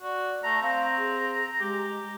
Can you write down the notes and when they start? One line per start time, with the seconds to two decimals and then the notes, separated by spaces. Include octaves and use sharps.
0.02 F#4 D5
0.44 A3 A5 A#5
0.62 C4 F5 A#5
0.98 G#4
1.60 G#3 G4